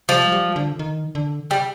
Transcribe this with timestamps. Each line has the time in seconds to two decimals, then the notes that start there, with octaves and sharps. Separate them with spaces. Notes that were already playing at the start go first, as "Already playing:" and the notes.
0.09 F3 G3
0.32 G3
0.56 D3
0.79 D#3
1.15 D3
1.51 G3